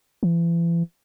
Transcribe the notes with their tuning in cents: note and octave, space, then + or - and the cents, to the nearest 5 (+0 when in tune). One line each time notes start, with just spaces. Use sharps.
E3 +40